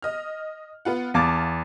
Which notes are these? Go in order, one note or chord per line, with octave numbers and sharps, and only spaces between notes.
D#5 F6
B3 F4 F#5
E2 F5 A5 D6 A6